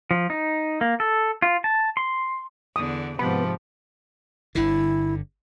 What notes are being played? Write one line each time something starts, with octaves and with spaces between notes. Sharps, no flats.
F3
D#4
A#3
A4
F4
A5
C6
E2 D3 D#6
G#2 C3 F3 B3 B5
G1 D3 E4